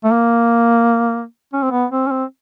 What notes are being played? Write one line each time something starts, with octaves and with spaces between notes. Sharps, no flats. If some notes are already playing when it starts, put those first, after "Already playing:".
A3
A#3
C#4
C4
B3
C4
C#4
C4